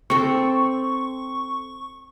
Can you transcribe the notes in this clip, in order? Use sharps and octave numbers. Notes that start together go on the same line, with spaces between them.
C4 A4 C#6